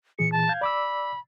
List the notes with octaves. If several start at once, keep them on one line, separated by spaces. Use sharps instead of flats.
A#2 E3 G#4 C#7
A5
F5 G6 G#6
D5 B5 D6 E6